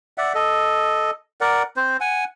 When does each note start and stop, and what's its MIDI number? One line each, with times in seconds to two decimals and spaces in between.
0.18 0.33 74
0.18 0.33 76
0.18 0.33 78
0.35 1.11 69
0.35 1.11 75
1.41 1.63 70
1.41 1.63 74
1.41 1.63 78
1.76 1.97 60
1.76 1.97 72
2.01 2.24 78
2.01 2.24 80